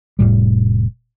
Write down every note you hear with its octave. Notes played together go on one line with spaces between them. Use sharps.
F1 C2 A2 G3